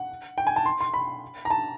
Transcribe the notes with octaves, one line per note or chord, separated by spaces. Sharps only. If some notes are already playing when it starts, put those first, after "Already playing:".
Already playing: F#5
G5
G#5
A5
C6
C6
B5
A#5
A5